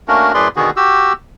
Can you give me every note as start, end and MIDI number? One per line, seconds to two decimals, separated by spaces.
0.08 0.32 57
0.08 0.32 58
0.08 0.32 61
0.08 0.32 62
0.08 0.32 66
0.08 0.32 70
0.34 0.48 42
0.34 0.48 45
0.34 0.48 68
0.34 0.48 71
0.34 0.48 74
0.34 0.48 84
0.56 0.71 47
0.56 0.71 50
0.56 0.71 51
0.56 0.71 59
0.56 0.71 66
0.56 0.71 68
0.77 1.13 66
0.77 1.13 67
0.77 1.13 88